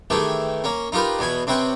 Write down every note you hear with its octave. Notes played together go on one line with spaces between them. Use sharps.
D#3 E3 A3 G4 G#4
A#3 C#4
D#4 F4 G4 A#4 B4
E2 B2 G#5 B5
C3 C4 C#4 B4 G5